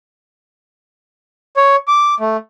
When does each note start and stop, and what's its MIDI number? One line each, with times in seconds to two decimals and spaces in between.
1.57 1.76 73
1.88 2.15 86
2.20 2.37 57